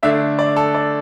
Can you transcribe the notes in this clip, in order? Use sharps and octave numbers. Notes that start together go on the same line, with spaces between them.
D3 A3 D4 E5
D5
A4
D5